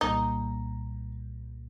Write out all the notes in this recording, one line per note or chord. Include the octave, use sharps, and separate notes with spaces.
C2 A#2 G3 A#3 D#4